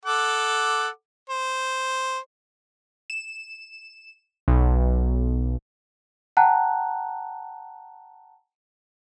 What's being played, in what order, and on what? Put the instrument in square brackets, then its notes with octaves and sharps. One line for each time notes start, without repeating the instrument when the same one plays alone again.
[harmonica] A4 F#5 D6
C5
[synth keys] E7
B1
[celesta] F#5 G5 A5 A#5 F#6